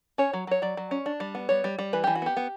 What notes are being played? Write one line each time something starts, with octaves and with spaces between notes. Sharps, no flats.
C#4 C#5
F#3
F#3 C#5
F#3 D5
F#3
C#4
D4
G3
B3
G3 C#5
G3
G3
E3 B4
E3 G4
F#4
B3 G4
B3